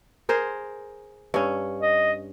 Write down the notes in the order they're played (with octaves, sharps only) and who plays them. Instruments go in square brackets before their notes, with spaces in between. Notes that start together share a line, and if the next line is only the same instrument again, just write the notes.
[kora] G#4 A#4 C5
G2 C#4
[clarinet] D#5